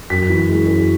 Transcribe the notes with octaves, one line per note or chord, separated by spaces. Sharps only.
F#2 B6
E3
G#3
F#2